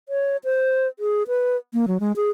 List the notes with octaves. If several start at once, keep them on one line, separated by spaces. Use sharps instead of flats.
C#5
C5
G#4
B4
A#3
F#3
G#3
G#4